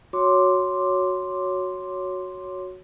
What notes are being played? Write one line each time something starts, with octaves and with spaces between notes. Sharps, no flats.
F#4 C#5 C6 D6